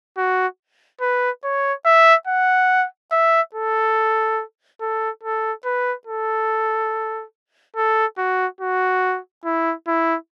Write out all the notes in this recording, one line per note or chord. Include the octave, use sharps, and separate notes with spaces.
F#4
B4
C#5
E5
F#5
E5
A4
A4
A4
B4
A4
A4
F#4
F#4
E4
E4